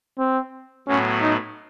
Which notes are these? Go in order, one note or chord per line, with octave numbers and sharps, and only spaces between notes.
C4
A2 F#3 B3 C#4
D#4